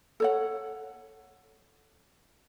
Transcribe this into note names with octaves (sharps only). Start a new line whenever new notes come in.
A4 C#5 F#5